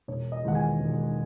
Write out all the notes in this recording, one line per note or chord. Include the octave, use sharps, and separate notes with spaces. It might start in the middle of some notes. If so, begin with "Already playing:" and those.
E1 C#5
D#5
E2 D#3 G#3 F#5
G#5
E1